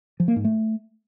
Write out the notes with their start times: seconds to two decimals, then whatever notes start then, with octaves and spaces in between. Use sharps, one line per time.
0.20 F3
0.28 A#3
0.36 G#2
0.44 A3